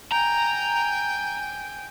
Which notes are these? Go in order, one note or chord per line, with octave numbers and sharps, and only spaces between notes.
G5 G#5 A#5